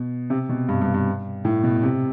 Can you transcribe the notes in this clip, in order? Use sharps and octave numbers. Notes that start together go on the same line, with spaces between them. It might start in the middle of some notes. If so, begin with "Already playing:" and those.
Already playing: B2
C3
B2
G2
G2
G2
A2
B2
C3